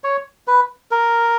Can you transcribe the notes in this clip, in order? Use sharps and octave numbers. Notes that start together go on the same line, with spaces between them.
C#5
B4
A#4